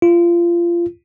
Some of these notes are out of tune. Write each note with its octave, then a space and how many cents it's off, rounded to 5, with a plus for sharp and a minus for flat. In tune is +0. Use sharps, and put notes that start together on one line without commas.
F4 -25